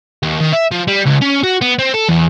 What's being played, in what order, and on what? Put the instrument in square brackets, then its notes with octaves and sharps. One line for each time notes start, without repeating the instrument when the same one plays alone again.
[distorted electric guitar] D#2
D#3
E5
F3
G3
C#2
C#4
F#4
B3
C4
A4
E2